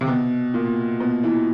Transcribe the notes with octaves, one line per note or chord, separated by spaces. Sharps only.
C3
B2
A#2
B2
E3